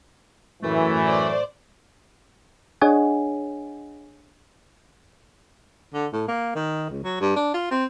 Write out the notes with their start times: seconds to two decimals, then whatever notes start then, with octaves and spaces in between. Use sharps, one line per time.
0.63 F#2 A2 E3 A3
1.05 C5 D5
2.81 D4 G#4 C#5 D#5 F#5 G#5
5.94 D3
6.13 A2
6.28 A#3
6.56 D#3
6.90 C#2
7.04 F#3
7.21 G2
7.36 D4
7.54 F4
7.71 C4